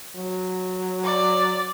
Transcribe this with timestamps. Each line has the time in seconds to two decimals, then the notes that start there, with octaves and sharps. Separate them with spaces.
0.16 F#3
1.04 D5